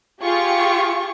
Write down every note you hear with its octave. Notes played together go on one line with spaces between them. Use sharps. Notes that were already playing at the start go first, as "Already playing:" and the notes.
F4 G4 G#4 C#6